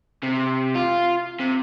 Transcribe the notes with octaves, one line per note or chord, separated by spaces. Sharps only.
C3
F4
C3